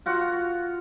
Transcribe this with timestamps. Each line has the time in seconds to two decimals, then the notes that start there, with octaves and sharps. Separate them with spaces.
0.06 F4 F#4 F#5